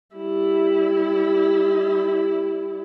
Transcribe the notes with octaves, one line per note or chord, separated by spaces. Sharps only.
G3 E4